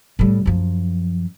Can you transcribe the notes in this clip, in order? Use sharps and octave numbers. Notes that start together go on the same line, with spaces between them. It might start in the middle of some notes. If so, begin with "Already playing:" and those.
A2 G3
F#2 F3